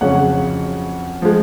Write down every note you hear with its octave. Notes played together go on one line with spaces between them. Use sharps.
F2 C#3 F#3 C#4 F#5
F3 G#3